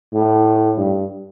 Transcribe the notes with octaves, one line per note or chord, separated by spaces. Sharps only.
A2
G2